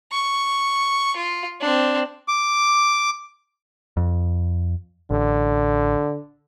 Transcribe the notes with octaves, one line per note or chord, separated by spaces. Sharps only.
C#6
F4
C4 D4
D6
F2
A1 D3